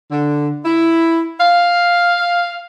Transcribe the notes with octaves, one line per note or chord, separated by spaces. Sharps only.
D3
E4
F5